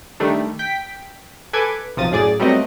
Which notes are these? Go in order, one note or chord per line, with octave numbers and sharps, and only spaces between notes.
D#3 G3 A3 D4
G5 B6
A4 B4 G#5 D6 G#6
B1 C3 F3 D#6 A6
F#2 A2 G#4 D5 A6
F#3 G3 A3 B3 C4 D#5